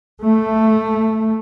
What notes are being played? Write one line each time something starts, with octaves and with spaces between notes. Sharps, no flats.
A3